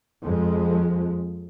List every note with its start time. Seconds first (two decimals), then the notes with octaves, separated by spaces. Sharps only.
0.22 F2 F3 G#3